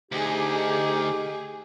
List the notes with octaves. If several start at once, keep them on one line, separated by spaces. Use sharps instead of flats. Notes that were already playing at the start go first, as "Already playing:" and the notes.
D2 D#4 G4 G#4